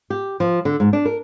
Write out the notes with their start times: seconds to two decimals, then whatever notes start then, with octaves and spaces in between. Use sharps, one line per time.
0.10 G4
0.40 F3
0.65 D3
0.80 G#2
0.93 D4
1.05 A#4